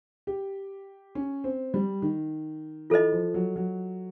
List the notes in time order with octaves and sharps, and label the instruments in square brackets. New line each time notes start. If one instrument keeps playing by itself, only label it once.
[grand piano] G4
C#4
C4
G3
D#3
[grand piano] E3 [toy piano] F4 A4 C5 D#5
[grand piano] F3
F#3
F#3